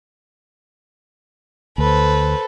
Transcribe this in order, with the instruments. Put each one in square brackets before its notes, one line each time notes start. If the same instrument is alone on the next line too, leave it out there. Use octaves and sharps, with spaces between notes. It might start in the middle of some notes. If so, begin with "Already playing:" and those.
[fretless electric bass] D2 [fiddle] A4 [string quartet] B4 C5